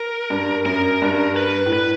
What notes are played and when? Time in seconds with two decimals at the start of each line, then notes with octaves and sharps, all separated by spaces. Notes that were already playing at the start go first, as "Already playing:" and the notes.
Already playing: A#4
0.30 G2
0.66 F#2 A#4
1.02 G2
1.36 B4
1.66 A2
1.73 B4